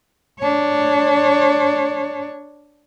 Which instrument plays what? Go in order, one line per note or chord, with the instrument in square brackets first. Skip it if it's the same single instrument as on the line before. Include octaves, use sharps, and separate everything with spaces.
[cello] D4 C#5